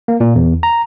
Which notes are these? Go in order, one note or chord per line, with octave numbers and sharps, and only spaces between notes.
A#3
A#2
E2
A#5